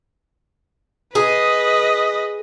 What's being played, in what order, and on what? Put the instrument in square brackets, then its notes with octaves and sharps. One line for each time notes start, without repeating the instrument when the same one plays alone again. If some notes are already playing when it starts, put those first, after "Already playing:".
[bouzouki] G#4 [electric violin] B4 D#5